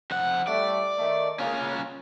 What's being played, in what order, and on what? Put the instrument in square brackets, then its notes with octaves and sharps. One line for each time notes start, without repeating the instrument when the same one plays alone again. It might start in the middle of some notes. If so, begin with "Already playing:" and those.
[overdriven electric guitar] F2 F#5
[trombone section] A2 G3 A3 [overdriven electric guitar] D5
[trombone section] D#3 A3
[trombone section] C#3 A#3 [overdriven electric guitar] C#4 F4